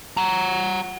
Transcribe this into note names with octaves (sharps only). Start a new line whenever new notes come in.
F#5 A#5